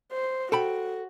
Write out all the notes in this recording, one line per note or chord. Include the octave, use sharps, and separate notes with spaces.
C5
F#4 A4 G5 B5